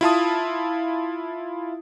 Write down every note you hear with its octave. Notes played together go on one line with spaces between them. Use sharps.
E4 F4 A5 D#6